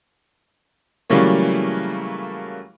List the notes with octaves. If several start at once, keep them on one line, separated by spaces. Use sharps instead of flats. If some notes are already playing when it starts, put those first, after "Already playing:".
C#3 E3 F#3 G3 A3 A#3